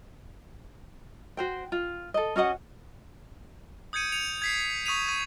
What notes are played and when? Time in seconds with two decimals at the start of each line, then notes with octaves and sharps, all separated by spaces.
1.37 F#4 C5 G5
1.72 F4
2.14 A4 D#5
2.36 C#4 F#4 D#5 F#5
3.93 D#6 G6 G#6 C#7 D#7
4.12 C#7 F7
4.42 G#6 B6 C7
4.86 C#6 D#6 B6 D#7 F7
5.08 C#6 G#6 D#7